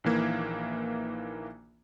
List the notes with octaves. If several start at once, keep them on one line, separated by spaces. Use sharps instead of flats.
A#1 D#3 E3 A#3 G#6